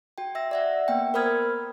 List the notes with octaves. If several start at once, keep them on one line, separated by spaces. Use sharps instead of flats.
F#4 G5
E5 E6 A#6
D5 E5 F#5
A#3 B3 G5
A#4 C5 B5 D#6 F6 G#6